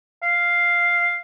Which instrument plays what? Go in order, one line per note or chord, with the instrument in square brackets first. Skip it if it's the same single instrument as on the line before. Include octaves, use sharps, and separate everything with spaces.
[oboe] F5